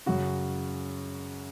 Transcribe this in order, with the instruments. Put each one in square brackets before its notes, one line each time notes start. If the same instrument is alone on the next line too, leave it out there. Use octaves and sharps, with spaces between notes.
[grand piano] F#2 C#3 F#4